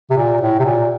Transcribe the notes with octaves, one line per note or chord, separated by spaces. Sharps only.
C3
A#2
A2
C3
A#2